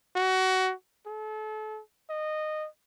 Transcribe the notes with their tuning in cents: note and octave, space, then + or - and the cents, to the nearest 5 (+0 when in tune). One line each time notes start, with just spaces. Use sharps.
F#4 +20
A4 -35
D#5 -15